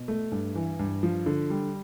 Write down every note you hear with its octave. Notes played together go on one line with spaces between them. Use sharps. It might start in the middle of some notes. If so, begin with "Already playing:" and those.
Already playing: B2
A3
G2
E3
G2
F3
D3
G3